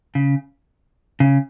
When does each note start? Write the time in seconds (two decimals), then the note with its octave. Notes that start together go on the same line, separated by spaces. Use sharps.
0.15 C#3
1.20 C#3